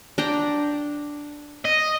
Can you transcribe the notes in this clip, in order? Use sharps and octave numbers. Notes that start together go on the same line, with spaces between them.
D4 G5 A#5
D#5